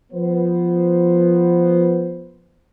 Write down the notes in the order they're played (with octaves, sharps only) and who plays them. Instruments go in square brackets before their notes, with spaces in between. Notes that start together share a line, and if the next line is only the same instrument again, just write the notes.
[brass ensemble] F3 B3 C5